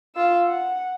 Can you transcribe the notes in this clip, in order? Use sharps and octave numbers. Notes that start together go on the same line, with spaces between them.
F4 E6
F#5